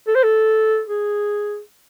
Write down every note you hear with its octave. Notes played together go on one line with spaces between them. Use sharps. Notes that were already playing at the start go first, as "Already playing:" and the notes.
A4
C5
A4
G#4